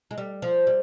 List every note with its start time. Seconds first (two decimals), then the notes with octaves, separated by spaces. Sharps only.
0.11 G#3
0.18 G3
0.42 F3
0.67 G3